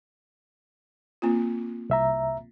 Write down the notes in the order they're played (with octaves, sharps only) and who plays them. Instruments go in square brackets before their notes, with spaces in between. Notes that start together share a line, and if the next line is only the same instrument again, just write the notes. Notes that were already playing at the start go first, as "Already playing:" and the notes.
[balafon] A#3 C4 F4
[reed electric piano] C2 E5 A#5